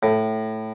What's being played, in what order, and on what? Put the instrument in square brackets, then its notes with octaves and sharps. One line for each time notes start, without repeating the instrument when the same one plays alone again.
[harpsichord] A2